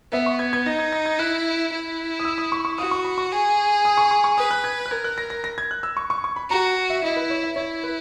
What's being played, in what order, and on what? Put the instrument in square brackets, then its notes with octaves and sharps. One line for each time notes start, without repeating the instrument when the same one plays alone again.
[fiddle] B3 [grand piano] E5
[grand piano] C#6
G#6
G#6
[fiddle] D#4 [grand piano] A#6
[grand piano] G#6
A#6
G#6
[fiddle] E4 [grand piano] F#6
[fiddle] E4
[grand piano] D#6
E6
D#6
C#6
C#6
[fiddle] F#4 [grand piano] D#6
[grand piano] C#6
B5
C#6
[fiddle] G#4
[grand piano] D#6
C#6
C#6
C#6
[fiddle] B4 [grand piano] D#6
[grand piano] F#6
G#6
F#6
[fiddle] A#4 [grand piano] G#6
[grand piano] F#6
A#6
A#6
A#6
G#6
F#6
E6
C#6
C#6
C#6
B5
[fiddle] F#4 [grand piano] A#5
[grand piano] E5
[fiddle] E4 [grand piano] D#5
[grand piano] B4
C#5
E5
[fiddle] E4 [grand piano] C#5
[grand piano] B4